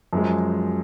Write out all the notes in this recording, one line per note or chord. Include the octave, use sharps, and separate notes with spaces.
F#2 F3 G#3